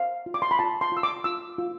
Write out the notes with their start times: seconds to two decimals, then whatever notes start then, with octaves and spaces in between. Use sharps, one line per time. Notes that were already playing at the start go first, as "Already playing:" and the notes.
Already playing: C5 F5
0.26 F4
0.34 D6
0.42 C6
0.51 B5
0.59 F4 A5
0.81 C6
0.92 F4 E6
1.03 D6
1.24 F4 E6
1.58 F4